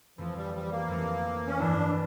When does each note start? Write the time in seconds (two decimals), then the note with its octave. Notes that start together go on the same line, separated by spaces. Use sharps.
0.18 F2 E3 F3 A3
0.36 G3
0.54 G3
0.71 A#3
0.88 F2 E3 A3
1.47 C#4
1.59 G2 E3 A3 D4 E4 G4